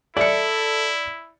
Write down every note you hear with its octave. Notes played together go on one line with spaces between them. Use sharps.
E4 A4 D5 E5 C#7